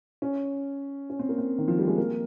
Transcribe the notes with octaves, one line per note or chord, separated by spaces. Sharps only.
C#4
C#4
C4
A#3
C4
D#3
F3
G3
G#3
A#3